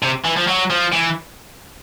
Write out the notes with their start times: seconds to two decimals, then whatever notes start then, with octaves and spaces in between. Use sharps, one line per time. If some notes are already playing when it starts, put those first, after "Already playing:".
0.02 C3
0.25 E3
0.36 F3
0.47 F#3
0.70 F3
0.92 E3